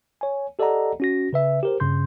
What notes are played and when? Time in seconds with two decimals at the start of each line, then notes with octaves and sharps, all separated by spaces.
0.21 C#5 G#5
0.59 G4 A4 D5 D#5 F#5 A#5
1.00 C#4 F#4 A#6
1.33 C#3 B4 E5
1.63 G4 A#4 C5
1.80 G2 C#3 C#4 C6 G6